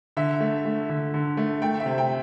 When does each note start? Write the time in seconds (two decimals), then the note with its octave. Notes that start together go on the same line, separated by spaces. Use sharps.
0.17 D3 E5
0.40 A3
0.65 A3
0.89 D3
1.14 D3
1.37 A3
1.62 A3 G5
1.80 E5
1.86 C3
1.98 G5